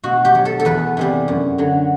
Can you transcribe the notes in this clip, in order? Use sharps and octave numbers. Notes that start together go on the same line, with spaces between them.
B2 F#4
G4
F#3
A4
A4
E2 B4
C3 E3 G3
F#2
D3 F#3